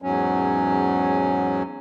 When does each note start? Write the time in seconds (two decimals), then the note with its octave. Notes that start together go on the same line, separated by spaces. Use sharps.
0.02 E2 G#2 F#3 C#4